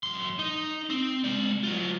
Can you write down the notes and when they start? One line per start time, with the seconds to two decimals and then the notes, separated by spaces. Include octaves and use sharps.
0.03 F#2 C6
0.39 D#4
0.90 C4
1.24 G#3 D5
1.63 F#3 F4